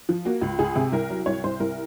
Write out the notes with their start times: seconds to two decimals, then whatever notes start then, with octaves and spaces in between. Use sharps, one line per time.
0.09 F3
0.25 A#3 F#4
0.41 C#2
0.59 C#2 G#4
0.76 C3
0.92 C2 A#4
1.10 F#3
1.26 C2 C#5
1.44 C2 C5
1.60 C2 A#4